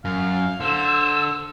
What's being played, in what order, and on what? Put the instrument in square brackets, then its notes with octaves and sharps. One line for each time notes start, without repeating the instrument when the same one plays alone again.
[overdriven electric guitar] F#2 [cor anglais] F5
[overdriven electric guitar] D3 [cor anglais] C5 [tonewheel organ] E6